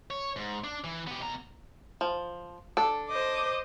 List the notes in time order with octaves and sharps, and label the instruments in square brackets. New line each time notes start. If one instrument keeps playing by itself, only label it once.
[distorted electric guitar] C#5
G#2
D4
E3
B3 G4
B2 A#5
[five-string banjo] F3
D4 A4
[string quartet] C5 D#5 D6